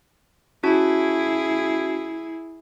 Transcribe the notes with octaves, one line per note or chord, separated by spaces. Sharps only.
C#4 E4 F#4 G#4 A5